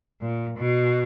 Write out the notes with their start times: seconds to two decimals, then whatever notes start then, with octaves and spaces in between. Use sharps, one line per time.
0.21 A#2
0.58 B2